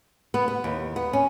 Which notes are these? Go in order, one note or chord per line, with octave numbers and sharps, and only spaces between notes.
B3
B3
D#2
B3
C#4